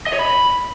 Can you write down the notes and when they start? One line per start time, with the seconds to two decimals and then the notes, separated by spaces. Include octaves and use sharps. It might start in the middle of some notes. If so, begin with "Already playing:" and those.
0.07 D#5
0.13 C#5
0.19 B5